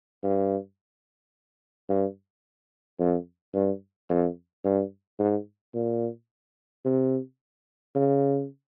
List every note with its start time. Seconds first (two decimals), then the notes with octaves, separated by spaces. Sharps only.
0.23 G2
1.89 G2
2.99 F2
3.54 G2
4.09 F2
4.65 G2
5.19 G#2
5.74 A#2
6.85 C3
7.95 C#3